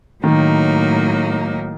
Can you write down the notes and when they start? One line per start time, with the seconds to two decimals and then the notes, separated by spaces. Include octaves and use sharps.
0.24 A2 D#3 F#3 A#3 D#4